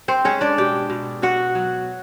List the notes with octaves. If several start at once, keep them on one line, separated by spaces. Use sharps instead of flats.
C4 C5
G#3 C#4 C#5
D4 D5
B2 G4 G5
B2
B2 F#4 F#5
F#3